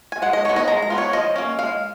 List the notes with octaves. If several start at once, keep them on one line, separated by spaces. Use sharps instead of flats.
G#5
G#3 F#5
D#5
B3 D#4 C#5
D#5
G#3 A#5
A#5
B3 F4
C#5
F3 D#5
A#3 C#4
G#3 F5